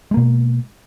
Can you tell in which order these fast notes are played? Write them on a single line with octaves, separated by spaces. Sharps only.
G#3 A#3 B2